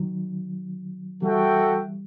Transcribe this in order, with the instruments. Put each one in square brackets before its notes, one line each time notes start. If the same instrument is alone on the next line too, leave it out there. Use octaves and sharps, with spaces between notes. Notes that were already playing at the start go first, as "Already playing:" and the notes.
Already playing: [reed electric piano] D#3 F#3
[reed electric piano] E3 G3 [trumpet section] F#4 A4 E5 G5